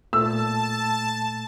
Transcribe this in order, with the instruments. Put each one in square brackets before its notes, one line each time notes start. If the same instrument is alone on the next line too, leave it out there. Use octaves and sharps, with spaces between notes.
[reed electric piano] A#2 A3 [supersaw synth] A5 [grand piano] E6